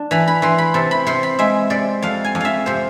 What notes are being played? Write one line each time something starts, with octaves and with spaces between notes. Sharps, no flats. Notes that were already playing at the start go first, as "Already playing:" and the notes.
Already playing: D4
E3 B5
B5
E3 C6
B5
C3 A5
B5
C3 C6
B5
G#3 E5
C3 D5
F2 F5
G#5
F2
E5 F5
C3 C5